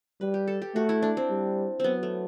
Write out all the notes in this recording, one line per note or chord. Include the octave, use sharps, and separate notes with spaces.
G3 B4
G4
A4
G4
A3 F#4
E4
D4
C4
G3
F#3 B3 C4
A3